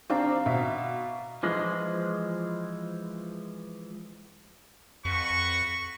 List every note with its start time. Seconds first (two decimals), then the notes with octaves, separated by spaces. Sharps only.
0.10 C4 D4 F5 A#5 D6
0.46 B2 E5
1.43 E3 F3 G#3
5.05 F2 F#4 B4 C#6